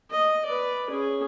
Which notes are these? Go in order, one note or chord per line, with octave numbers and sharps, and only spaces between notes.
D#5
B4 D5
C#4 G#4